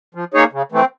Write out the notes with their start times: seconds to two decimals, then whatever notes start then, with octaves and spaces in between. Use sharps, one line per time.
0.14 F3
0.34 A#3 D#4 G#4 C#5
0.52 C#3
0.72 E3 A3 C4